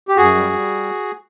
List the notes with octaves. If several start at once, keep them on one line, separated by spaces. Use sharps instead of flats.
G4
F#2 F#4 G#4
G3
G3